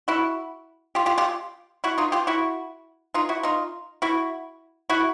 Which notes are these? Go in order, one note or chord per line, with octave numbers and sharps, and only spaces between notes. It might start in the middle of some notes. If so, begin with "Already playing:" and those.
E4 F#4
F4 G4
F4 G4
F4 G4
E4 F#4
D#4 F4
F4 G4
E4 F#4
D#4 F4
E4 F#4
D#4 F4
E4 F#4
E4 F#4